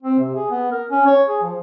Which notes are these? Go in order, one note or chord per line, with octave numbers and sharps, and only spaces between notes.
C4
C3
G#4
B3
A#4
C#4
C#5
G#4
F3